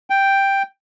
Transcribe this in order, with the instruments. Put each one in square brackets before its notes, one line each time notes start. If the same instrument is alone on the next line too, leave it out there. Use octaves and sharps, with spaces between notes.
[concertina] G5